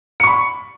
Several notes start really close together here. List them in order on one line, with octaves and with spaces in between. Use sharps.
C#7 C#6 B5